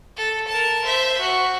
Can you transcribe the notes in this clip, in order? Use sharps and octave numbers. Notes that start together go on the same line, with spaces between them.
A4
A#4 A5
C5 E5
F#4